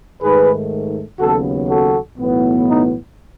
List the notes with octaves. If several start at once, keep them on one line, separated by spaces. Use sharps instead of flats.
G#2 D#3 A3 G#4 B4
D#2 C#3 F#3 B3 F#4 A4
F#4 A4
B1 A2 E3 B3
D#4